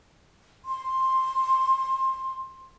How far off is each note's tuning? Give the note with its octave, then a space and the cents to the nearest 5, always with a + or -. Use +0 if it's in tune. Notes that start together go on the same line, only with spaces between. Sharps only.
C6 +10